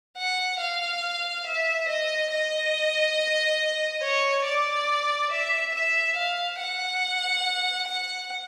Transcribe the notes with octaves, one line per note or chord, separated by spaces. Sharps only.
F#5
F5
E5
D#5
D#5
C#5
D5
E5
E5
F5
F#5
F#5